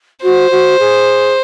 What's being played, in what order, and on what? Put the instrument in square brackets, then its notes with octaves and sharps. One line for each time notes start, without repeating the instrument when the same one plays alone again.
[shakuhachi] F#4 [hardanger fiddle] C5
[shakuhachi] F#4
G#4